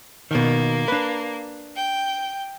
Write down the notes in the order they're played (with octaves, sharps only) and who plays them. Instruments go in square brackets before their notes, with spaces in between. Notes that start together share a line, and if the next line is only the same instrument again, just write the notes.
[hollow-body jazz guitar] B2 D#3 [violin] A#3
[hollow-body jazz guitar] D4 B4
[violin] G5